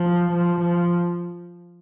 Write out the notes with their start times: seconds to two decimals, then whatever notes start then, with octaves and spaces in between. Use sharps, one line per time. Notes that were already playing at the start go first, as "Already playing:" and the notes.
Already playing: F3
0.32 F3
0.59 F3